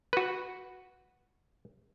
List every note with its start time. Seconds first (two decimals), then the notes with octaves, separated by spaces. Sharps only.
0.13 F#4 B4